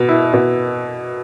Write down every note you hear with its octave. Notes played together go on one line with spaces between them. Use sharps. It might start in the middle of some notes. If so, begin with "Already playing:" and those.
Already playing: B2
E4
B2